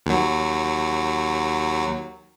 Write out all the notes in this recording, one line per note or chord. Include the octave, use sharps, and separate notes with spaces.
D#2 F#3